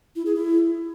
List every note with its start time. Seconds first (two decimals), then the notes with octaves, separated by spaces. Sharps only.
0.16 E4
0.26 G#4
0.36 E4